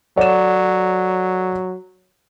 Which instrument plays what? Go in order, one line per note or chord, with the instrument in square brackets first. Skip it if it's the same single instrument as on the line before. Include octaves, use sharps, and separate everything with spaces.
[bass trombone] F#3 [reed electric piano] A4 C#5 F#5 [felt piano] D5 E7